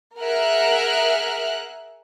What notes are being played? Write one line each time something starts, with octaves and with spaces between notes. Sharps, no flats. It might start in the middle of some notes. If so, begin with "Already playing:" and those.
G#4 A#4 E5 F#5 F6 F#6